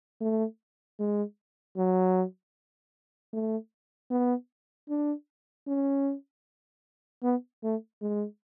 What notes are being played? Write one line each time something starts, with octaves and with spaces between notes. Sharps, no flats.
A3
G#3
F#3
A3
B3
D4
C#4
B3
A3
G#3